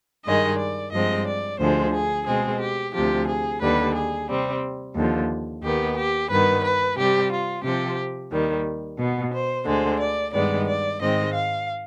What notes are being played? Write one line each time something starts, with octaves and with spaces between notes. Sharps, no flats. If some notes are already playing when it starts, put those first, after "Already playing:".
G2 D#3 G#3 D#5
D5
G2 F3 G#3 C4 D#5
D5
D2 D3 F3 G#3 C5
G#4
B2 G#3 C4 G#4
G4
D2 C3 F3 G4
G#4
D#2 D3 G3 B4
G#4
C3 G3 C4
D#2 D3 F3
D#2 D#3 B3 G4
G4
G2 D#3 B3 B4
B4
C3 G3 C4 G4
F4
C3 F3 C4 G4
D#2 D#3 G3
B2 B3
C5
D2 D3 G#3 C5
D5
G2 D#3 G#3 B3 D5
D5
G#2 D#3 G#3 C4 D#5
F5